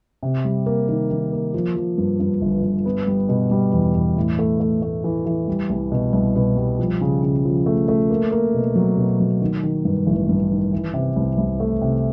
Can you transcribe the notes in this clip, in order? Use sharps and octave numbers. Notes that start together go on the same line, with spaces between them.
C3
G3
A#3
D#3
D#3
A#3
F3
F3
G2
G2
G1
G1
B3
G3
B2
G3
E2
E2
A2
A3
A3
A3
E3
E3
G3
C2
B2
C2
B2
G3
F3
C#3
C#3
F3
A3
A3
A#3
A#3
B2
F#3
B2
F#3
D#3
D#3
G2
A1
G2
D#3
E3
C3
C2
C2
A3
C3